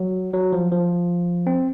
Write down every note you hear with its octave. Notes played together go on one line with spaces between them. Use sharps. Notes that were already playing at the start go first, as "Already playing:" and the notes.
Already playing: F#3
F#3
F3
F3
C4